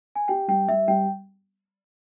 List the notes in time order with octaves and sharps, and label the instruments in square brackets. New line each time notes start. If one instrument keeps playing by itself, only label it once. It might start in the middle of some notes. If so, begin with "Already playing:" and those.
[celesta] G#5
[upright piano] G4 [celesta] G5
[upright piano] G3 [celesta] G5
[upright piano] G3 [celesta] E5
[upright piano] G3 [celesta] G5